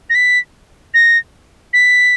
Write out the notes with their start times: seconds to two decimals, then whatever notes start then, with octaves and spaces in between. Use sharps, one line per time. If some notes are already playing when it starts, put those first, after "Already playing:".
0.10 A#6
0.15 B6
0.94 A#6
1.73 B6